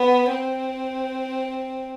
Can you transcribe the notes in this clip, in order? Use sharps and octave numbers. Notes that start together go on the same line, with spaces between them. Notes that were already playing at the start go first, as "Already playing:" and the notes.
Already playing: B3
C4